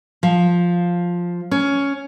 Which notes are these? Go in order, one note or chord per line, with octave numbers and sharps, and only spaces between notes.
F3
C#4